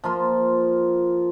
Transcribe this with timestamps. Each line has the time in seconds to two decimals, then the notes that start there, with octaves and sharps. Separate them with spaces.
0.04 F3 A#3 F4 C6